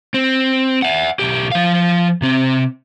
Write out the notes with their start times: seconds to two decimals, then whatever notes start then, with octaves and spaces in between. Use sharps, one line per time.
0.14 C4
0.82 E5 F#5
1.19 B1 G4
1.51 F3 F5
2.22 C3 C4